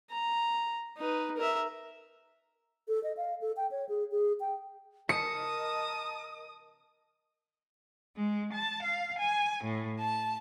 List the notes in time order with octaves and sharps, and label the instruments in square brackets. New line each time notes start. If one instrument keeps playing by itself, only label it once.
[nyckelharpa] A#5
D#4 B4
A#4 E5
[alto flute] A4
D#5
F5
A4
G5
C#5
G#4
G#4
G5
[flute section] A#4 D#5 [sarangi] A5 [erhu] D#6 [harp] C#7
[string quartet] G#3
A5
F5
G#5
A2
A5